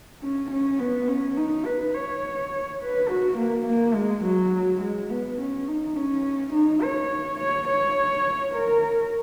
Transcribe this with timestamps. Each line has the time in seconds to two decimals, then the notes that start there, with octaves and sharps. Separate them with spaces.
0.22 C#4
0.51 C#4
0.79 B3
1.08 C#4
1.37 D#4
1.65 B4
1.94 C#5
2.81 B4
3.09 F#4
3.38 A#3
3.66 A#3
3.95 G#3
4.24 F#3
4.81 G#3
5.10 B3
5.39 C#4
5.68 D#4
5.96 C#4
6.53 D#4
6.83 C#5
7.40 C#5
7.68 C#5
8.54 A#4